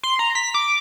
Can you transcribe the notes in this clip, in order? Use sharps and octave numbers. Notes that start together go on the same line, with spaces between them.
C6
A#5
B6
D6